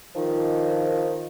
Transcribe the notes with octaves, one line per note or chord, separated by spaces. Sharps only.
D#3 F3